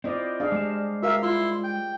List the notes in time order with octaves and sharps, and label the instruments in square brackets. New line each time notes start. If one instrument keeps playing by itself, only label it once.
[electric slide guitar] C4 E4 F4 [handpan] C5 D5 D#5
[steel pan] D4 [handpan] G#4 F5
[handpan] G3 [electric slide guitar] G#3 A5
[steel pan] F#4 A#4 F5 [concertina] E5
[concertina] E4 C6 [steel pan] F4
[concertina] G5